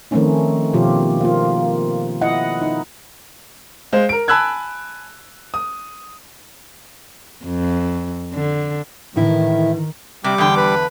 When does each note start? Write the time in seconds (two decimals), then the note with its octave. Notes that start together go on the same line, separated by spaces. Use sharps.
0.11 D#3 F3 A3 C4 C#4 D#4
0.73 B2 D#3 F3 F4 G4
1.21 A#3 F4
2.21 E4 D#5 F#5
2.62 D#4
3.93 G#3 C5 F5
4.09 A#4 D7
4.28 G#5 A5 B5 E6 F#6 G#6
5.54 D#6
7.46 F2
8.33 D3
9.16 A2 D#3 E3 E4
10.24 C3 G3 D6
10.38 E2 D3 G5
10.57 B4